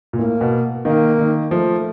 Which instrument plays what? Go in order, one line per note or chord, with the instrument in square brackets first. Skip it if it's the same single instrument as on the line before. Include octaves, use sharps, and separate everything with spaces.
[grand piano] A#2
[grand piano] A2 [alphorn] A#3
[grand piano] B2
[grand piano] D#3 [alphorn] A#3
[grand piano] D#3
[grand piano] F3 [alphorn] A3